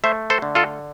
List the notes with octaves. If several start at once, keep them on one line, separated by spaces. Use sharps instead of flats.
A3 C5 E5
A4 C5
D3
F4 A4